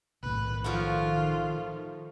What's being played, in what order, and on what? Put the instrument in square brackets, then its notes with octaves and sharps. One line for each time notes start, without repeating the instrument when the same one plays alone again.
[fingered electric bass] B1 A2 [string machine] D#3 [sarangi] B4
[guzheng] F3 A3 F#4 [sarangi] F4